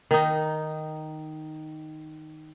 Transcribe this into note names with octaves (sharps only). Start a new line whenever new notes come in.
D#3 D#4